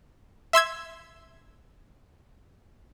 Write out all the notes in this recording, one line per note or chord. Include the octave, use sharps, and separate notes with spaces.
E5 C6 E6 G#6